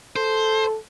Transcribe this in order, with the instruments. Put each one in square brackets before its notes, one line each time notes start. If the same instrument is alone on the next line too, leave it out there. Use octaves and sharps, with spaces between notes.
[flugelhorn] A4 [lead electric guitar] C5